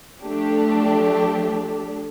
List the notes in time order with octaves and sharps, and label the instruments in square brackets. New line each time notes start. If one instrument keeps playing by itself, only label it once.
[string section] F3 A3 D4 G4